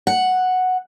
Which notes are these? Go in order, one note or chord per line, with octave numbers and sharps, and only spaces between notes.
F#5